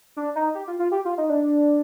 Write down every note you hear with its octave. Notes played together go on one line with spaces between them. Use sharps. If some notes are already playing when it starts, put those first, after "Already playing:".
D4
D#4
G4
F4
F4
G4
F4
D#4
D4